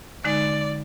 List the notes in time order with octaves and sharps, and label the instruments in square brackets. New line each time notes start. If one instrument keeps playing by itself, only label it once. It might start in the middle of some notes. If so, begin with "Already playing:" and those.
[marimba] D3 G#3 D#4 [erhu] D5